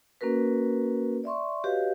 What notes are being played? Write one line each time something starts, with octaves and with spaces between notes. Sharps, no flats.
A#3 C#4 F#4 A#4 B4
D5 E5 C6 C#6
F#4 G4 B4 C#5 D#5 F5